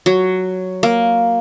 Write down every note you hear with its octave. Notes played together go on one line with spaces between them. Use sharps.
F#3
A#3